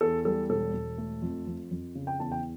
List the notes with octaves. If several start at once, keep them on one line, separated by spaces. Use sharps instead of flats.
E2 A4
G3 A4
E1 A4
E1
A3
F2
F2
F2
C#3
G5
E2 A5
G5